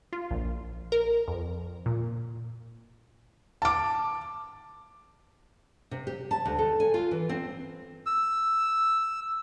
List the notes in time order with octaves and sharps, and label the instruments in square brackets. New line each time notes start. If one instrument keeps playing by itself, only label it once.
[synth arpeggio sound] F4
A#1
A#4
F2
A#2
[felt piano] A5 D6
[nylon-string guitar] C3
G4
A5
D2
A4
G#5
F4
E3
C4
[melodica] E6